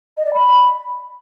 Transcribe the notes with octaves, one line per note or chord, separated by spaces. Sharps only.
D#5
D5
B5